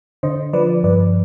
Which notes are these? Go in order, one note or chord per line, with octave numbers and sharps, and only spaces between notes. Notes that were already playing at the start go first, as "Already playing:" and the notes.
D3 C5 D#5
F3 B4 D5
G2 B4 D5